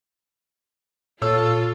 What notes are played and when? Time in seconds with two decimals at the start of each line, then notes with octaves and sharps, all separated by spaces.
1.22 A#2 F4 A4 C#5 E6